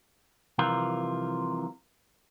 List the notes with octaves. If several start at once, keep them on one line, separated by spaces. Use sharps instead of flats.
C2 C3 E3 F3 F4 A#4